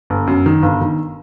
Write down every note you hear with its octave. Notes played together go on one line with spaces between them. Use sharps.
G1
F#2
D#3
G1
D#3